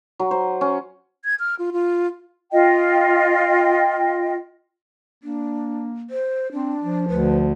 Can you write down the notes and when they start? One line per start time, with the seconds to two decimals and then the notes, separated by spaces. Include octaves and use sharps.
0.19 F#3
0.31 C5
0.61 C#4
1.25 G#6
1.40 F6
1.59 F4
1.73 F4
2.52 F4 D#5 G5
5.24 A#3 D4
6.10 C5
6.52 C4 D4
6.82 F3
7.09 D2 B4